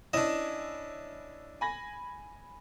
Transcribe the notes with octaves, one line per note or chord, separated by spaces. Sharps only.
C#4 D4 E4 D#5 E7
G#5 B5 A#6